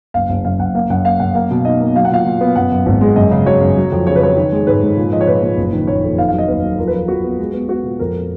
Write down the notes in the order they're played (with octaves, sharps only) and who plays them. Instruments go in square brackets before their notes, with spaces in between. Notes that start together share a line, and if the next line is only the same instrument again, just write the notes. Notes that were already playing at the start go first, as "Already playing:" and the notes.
[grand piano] F#1 F5
F#1 F5
F#2 F5
F#1 F#5
A#3 F5
F#2 F#5
A#3 F5
F#2 F#5
A#3 F5
B2
D#4 D#5
A#3
F#3 F5
F#5
A#2 F5
A#2
B3
F#2 F#5
F#2
G#1
G#3
F#2 D#5
C#3
F#3 C#5
F#2
F#3
F2
C#3 C#5
B4
F#3 C#5
D#3
G#3
G#2 B4
G#2
A#2
F3 D#5
C#5
A#2 B4
A#2
F#1
D#3
F#1 C#5
F2
D#3 F5
F#3 F5
D#5
D#2 B4
F#3
F3 A#4
B4
F3 A#4
F3 F#4
B3
G#3
B3
B3 F#4
A#2
F2 A#4